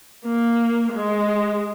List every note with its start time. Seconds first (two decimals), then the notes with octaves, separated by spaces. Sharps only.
0.25 A#3
0.92 G#3